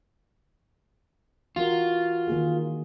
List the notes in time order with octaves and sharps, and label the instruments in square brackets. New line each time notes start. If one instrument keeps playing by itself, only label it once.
[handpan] E3 F#4 A#4 [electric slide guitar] F4
[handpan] D#3 A#3 G#4